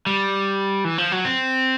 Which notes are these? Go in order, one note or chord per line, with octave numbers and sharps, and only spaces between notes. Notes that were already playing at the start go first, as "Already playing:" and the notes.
G3
E3
F3
F#3
C4